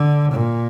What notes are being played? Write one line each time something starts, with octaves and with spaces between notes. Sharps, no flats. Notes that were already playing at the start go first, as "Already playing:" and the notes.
Already playing: D3
A#2